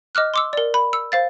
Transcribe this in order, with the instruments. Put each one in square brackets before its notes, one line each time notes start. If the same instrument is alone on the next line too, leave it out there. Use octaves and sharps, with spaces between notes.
[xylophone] D#5 D6 F6 F#6
C6 D6 E6
A#4 D5
B5
E6
C5 F5 A6